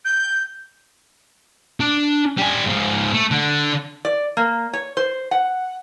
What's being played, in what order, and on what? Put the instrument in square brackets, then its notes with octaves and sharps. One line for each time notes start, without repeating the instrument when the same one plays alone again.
[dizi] G6
[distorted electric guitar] D4
G3 G#5
G#2 F3
A3
D3
[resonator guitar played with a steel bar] D5
A#3
C#5
C5
F#5